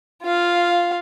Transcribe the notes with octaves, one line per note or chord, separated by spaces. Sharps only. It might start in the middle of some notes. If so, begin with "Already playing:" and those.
F4 F5